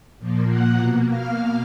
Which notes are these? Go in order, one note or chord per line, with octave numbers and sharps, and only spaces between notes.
A#2 F3 A#3
F#5 F#6
B2 A#3
F5 F6